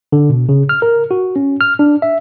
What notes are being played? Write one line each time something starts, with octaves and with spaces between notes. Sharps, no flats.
D3
B2
C#3
F6
A#4
F#4
C#4
F6
D4
E5